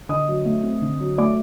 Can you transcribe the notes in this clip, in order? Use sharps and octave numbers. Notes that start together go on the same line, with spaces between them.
D3 D#5 D#6
F#3
A3
C4
D3
F#3
A3 D5 D6